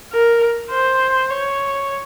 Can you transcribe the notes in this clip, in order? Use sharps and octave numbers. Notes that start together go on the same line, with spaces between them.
A#4
C5
C#5